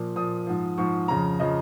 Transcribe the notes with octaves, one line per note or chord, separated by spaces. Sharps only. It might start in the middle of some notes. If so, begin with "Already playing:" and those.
Already playing: A#2 F3
A#2 F3 D#6
G#2 F3
G#2 F3 C#6
F2 C#3 F3 A#5
C#3 F3 D#5